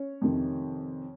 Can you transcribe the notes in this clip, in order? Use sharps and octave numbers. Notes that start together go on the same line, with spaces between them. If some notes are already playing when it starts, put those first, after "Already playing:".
Already playing: C#4 C#5
F2 C3 D#3